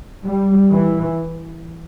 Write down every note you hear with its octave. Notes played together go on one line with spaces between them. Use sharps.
G3
E3